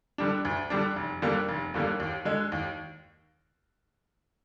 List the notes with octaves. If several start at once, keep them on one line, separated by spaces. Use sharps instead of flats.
D3 G3 D4
D2
D3 G3 D4
F1
D#2 D3 G3 A#3
F1
D#2 D3 G3 A#3
D#2
D3 G#3
D#2